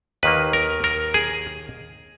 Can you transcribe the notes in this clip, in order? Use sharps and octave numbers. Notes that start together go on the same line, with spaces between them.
D#2 D#3 A#3 B4
A#4
A#4
G#4